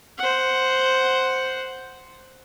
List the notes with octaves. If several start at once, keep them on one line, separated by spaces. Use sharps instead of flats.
C5 F#5